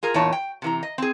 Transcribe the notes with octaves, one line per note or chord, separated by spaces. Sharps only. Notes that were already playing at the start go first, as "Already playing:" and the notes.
F4 G#4 A#4
E2 A#2 D#4 C#5 A5
G5
C3 E3 A#5
D#5
C4 G#4